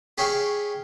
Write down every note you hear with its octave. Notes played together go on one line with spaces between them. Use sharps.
G4 G#4 C#5 E5 F5 G5